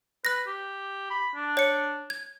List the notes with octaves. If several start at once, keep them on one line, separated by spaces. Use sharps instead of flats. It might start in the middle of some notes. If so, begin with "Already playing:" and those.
B4 F#6 A#6
G4
B5
D4
C#5 C#7
G#6